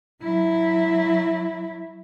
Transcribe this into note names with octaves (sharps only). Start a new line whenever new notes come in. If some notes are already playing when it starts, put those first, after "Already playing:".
F#3 E4